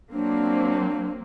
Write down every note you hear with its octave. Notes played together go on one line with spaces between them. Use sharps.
F#3 A#3 C4 D4